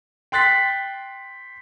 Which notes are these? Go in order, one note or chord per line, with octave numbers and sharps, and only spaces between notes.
G5 C6 F#6 A6 B6